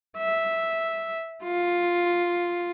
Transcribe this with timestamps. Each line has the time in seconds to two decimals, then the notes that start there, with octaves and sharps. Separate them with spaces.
0.17 E5
1.44 F4